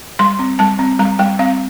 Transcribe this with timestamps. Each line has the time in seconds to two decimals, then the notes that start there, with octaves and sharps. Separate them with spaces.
0.19 G3 C6
0.39 C4
0.59 G3 A5
0.79 C4
0.99 G3 A#5
1.19 G3 G5
1.39 C4 F5